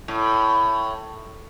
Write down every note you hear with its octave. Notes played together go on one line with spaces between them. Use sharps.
A2